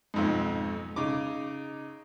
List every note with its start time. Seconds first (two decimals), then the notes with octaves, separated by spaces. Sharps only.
0.14 B1 F2 G#2
0.96 C#3 D#4 D6